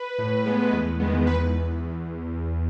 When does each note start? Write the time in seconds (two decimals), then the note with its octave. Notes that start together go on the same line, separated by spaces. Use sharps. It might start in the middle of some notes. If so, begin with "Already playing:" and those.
Already playing: B4
0.18 A2
0.46 G#3 B3
0.73 E2
1.00 D#3 G#3 B3
1.27 E2 B4